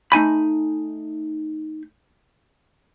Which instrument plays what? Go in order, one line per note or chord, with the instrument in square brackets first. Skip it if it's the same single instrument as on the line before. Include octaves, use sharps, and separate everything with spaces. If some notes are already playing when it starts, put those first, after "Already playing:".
[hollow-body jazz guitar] A3 D#4 G#5 B5